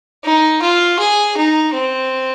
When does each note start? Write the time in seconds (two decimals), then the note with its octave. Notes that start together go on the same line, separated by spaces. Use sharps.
0.24 D#4
0.62 F4
0.99 G#4
1.37 D#4
1.74 C4